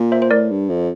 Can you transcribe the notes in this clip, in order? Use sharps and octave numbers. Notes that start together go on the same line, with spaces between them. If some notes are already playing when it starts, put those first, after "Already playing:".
Already playing: A#2
C5 E5
C5
A2 A#4 D5
G2
F2